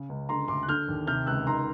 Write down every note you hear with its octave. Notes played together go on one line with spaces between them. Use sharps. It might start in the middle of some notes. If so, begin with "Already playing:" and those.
Already playing: C#3
C#2
D3 A#5 C6
D2 C6 D6
F#6
D3 F6 G6
D#2
C3 F6 G6
C#2 E6 F#6
D#3 A#5 C6